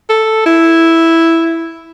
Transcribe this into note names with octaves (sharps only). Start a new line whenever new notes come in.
A4
E4